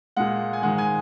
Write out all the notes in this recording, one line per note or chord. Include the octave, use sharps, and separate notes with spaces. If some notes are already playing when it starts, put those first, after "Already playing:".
A#2 G#3 F#5
G#5
G#2 D#3 G#3 F#5
G#5